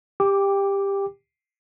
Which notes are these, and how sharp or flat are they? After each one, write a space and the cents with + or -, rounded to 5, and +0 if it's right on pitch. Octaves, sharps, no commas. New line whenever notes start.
G4 +15 G5 +20 D6 +0